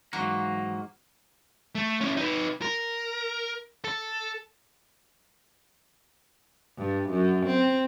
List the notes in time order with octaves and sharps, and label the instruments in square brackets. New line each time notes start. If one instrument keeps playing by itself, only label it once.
[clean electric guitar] G#2 A#3 [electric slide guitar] E3 F#3 [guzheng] F#4
[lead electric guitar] A3
C#4 E4
D#4 B4
A#4
A4
[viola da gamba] G2
F#2
C4